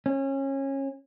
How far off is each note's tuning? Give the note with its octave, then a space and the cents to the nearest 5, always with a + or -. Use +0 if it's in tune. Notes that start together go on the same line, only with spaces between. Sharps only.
C#4 -25